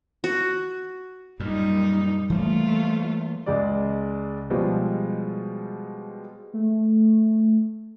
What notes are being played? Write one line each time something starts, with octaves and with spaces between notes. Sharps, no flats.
F#4
F#2 A#2 G3 D#4
E3 G3 A3 A#3 F4
C#2 G#3 D5
B2 F3 G3 G#3
A3